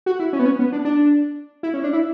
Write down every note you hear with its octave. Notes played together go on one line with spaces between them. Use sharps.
F#4
E4
C#4
B3
C#4
B3
D4
D4
E4
C#4
D4
E4